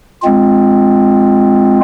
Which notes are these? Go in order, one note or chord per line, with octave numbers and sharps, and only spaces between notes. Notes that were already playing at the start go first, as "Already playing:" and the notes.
G#3 C4 F4